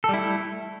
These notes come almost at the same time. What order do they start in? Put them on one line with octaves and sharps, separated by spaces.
A4 G3 E4 A3